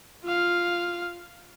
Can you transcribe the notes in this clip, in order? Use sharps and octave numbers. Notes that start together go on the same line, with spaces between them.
F4 F5